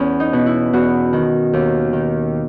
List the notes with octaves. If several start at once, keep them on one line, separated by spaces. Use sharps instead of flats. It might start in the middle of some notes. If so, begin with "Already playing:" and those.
Already playing: E2 C#4
D#4
B2
E4
E2 F#4
D#3
D#2
D#3